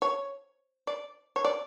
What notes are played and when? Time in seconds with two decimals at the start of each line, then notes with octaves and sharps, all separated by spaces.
0.02 C#5
0.87 D5
1.36 C#5
1.45 D5